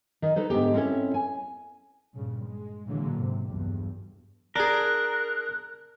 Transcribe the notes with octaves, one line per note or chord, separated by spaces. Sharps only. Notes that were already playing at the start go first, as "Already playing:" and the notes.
D#3
D#4 A4 B4 C5
G#2 D3 B3 G4
C4 C#4 E4 A4 C#5
G#5
G2 A#2 C#3
G#3
A#2 D3 E3 F#3 G#3 A#3
G#2 C3
B1 E2 G2
D4 G#4 A#4 F#6